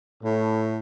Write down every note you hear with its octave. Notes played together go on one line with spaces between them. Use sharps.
A2